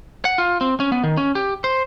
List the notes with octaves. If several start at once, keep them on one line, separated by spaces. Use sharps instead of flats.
F#5
F4
C4
C#4
B3
D#3
C#4
G4
C5